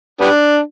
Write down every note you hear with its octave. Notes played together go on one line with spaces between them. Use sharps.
G3 B3 D4